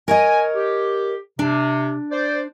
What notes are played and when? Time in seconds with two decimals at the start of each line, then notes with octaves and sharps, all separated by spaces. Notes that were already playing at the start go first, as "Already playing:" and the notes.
0.08 A#4 C#5 D#5 G#5
0.55 G4
1.39 C3 D4
2.11 C5 D5